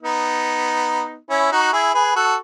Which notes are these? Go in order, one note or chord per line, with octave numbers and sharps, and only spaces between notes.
B3 D#4
C#4 E4
D#4 F#4
E4 G#4
G#4 B4
F#4 A4